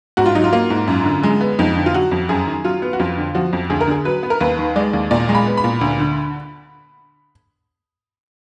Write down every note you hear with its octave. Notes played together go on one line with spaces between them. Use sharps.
G#2 F#4
F4
F#3 D#4
F4
A#3
G#2
F#2
D3
G#3
B3
F2 D#4
D3
F4
F#3 F#4
F2
F#2 G#4
D#3
F#3 F4
B3
F#4
F2 F4
D3
F3 F#4
F2
D2 G#4
A#4
D3 G#4
F#3 B4
B3
A#4
D#2 B4
D#3
G#3 D5
D#2
A#2 D5
G#3
B5
B3
B5
A#2
D2
D3